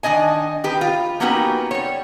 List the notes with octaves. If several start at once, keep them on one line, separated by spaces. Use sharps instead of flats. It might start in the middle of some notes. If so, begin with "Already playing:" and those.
D#3 A#3 D4 D#5 G#5
D#3 G4 B4
F4
A#3 B3 C#4 D#4 F#4 G4
G3 C#5